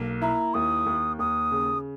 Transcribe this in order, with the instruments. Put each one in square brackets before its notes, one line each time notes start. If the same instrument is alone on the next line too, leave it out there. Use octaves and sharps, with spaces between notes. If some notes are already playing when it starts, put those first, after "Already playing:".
Already playing: [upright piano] B1 A#3
[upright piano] E4 [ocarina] A#5
[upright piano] D#2 [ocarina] D#6
[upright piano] D#2
[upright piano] D#2 [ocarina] D#6
[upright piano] C#3